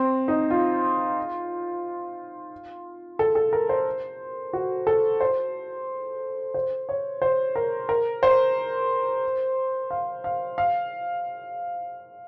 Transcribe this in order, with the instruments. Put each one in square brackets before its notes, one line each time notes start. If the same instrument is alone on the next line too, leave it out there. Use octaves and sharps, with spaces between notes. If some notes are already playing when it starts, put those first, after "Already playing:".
Already playing: [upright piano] C4
D#4
F4
A4
A4
A#4
C5
F#4
A4
C5
C5
C#5
C5
A#4
A#4
C5
F5
F5
F5